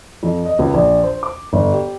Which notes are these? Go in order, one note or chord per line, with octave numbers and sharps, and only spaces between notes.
F2
D#5
C#2
A#1
C5
D6
G1
G4